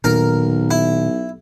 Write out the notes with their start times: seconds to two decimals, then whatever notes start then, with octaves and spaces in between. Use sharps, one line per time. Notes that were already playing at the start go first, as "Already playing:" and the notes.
0.04 B1 A#2 D#3 A#4
0.71 E4